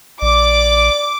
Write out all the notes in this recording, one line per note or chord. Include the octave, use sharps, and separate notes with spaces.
A#1 D5 D6